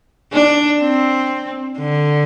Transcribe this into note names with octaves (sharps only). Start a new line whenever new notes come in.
D4
C4
D3